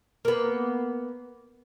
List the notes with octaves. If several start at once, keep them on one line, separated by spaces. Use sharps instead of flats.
A#3 B3